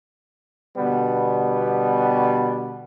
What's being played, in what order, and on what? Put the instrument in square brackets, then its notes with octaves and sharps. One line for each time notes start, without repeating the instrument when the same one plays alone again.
[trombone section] B2 D3 G3 B3